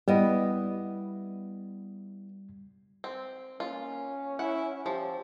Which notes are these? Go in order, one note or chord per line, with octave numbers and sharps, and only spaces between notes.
G3 B3 E4 D#5
C4
A#3 C#4 F4
E4 F#5
F3 G4